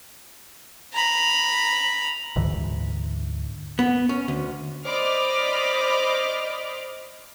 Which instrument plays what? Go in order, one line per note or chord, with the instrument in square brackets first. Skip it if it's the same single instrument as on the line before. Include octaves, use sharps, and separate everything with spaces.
[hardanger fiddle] A#5 B5
[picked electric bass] D2 G#2 D3 E3
[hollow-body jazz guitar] B3
C#4
D2
[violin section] C5 D5 D#5 B5 D6 F6